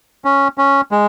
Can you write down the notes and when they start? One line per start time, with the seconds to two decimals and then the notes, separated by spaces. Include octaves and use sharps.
0.25 C#4
0.58 C#4
0.91 G#3